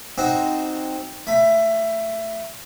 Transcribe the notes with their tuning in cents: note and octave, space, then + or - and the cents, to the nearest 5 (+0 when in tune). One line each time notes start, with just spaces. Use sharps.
C4 +0 D#4 +0 F#4 +0
A3 +15 B5 +0